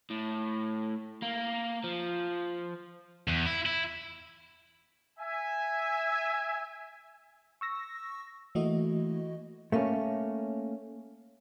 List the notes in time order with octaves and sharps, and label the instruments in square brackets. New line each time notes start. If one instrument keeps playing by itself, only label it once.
[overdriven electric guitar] A2
A#3
F3
[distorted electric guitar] E2
E4
E4
[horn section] E5 G#5
[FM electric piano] C#6 E6 A#6
E3 A3 A#3 E4 F#4 D#5
[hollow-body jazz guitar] A3 A#3 C#4